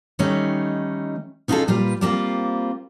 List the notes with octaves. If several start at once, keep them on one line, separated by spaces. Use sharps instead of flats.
D#3 G3 A3 C#4 D#4
C#4 D#4 F4 F#4 G#4 A4
A#2 G3 F4 G4 B4
G3 A#3 C4 F4